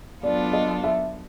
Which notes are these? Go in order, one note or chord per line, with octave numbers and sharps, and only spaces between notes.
F#3 B3 D4 F4 A4 D5
D#5
E5